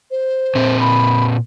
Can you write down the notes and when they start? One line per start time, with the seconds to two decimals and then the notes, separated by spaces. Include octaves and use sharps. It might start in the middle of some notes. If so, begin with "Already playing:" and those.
0.11 C5
0.55 A#2 C4
0.80 B5